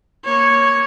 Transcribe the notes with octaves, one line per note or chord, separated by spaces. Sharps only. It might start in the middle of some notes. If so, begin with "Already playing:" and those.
A#3 C#5